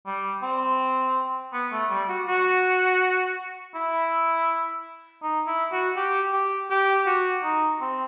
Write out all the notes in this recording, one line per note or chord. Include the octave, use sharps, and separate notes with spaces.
G3
C4
B3
A3
G3
F#4
F#4
E4
D#4
E4
F#4
G4
G4
G4
F#4
D#4
C4